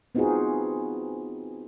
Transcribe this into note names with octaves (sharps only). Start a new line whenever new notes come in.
B3 C4 D#4 F4 F#4 G#4